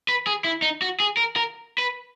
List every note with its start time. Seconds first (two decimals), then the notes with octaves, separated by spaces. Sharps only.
0.09 B4
0.27 G#4
0.44 E4
0.62 D#4
0.82 F#4
1.00 G#4
1.17 A#4
1.36 A#4
1.78 B4